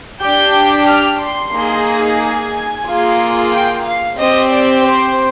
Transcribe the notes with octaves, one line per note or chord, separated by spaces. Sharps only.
D4 G4 G6
F6
C6
A#3 D#4 G#4
G#5
A#3 F4 G#4
G5
F5
C4 G4 D#5
D5
C5